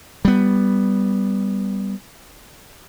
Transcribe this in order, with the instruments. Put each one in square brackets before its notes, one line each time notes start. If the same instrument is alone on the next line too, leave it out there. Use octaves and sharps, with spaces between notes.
[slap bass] G3 B3